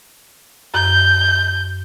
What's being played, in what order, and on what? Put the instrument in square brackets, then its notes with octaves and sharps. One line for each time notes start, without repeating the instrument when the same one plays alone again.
[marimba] F#2 [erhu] G6